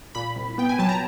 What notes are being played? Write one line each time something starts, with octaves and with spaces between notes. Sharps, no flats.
A#2 B5
C2
B3 G5
G#5
F#3 A5
A#5